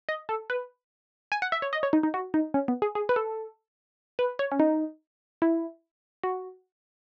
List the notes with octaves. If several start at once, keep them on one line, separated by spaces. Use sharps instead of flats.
D#5
A4
B4
G#5
F#5
E5
C#5
D#5
C#5
D#4
D#4
F#4
D#4
C#4
B3
G#4
G#4
B4
A4
B4
C#5
C#4
D#4
E4
F#4